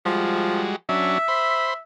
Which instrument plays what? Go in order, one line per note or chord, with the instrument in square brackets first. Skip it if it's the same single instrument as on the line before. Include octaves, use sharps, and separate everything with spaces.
[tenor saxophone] F3 [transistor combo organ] G3 G#3 F#4
[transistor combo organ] F#3 C#4 D4 [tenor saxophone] E5
[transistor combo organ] C5 B5